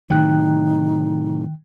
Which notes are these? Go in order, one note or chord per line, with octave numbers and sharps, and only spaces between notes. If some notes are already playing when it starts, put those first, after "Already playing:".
A2 C3 D#3 F#3 D#4 G5 F#6